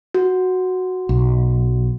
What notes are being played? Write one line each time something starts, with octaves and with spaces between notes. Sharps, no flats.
F#4
B1